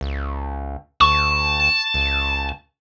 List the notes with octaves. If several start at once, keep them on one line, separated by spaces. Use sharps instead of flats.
C#2
D2 A5 C#6
C#2